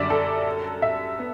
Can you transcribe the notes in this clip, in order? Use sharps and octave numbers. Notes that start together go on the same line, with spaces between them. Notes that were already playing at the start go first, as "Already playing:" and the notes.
Already playing: F#2 D3 G3 D4 D5 E5
A4
E5
B3